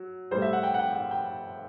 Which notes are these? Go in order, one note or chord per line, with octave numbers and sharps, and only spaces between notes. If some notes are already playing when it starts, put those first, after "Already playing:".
Already playing: F#3
A2 G3 C5
E5
F#5
G5
F#5
G5
F#5
G5